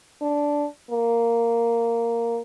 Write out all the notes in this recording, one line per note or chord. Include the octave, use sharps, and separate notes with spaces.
D4
A#3